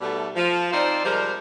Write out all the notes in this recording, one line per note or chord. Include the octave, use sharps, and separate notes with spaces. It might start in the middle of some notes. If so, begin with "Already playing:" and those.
G#2 B2 G3 A3
F3
C4 D#4 F4 C5 D5
C3 F3 G3 G#3 A#4 C5